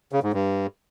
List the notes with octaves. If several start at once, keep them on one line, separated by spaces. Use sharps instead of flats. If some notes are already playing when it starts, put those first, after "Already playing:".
C#3
G#2
G2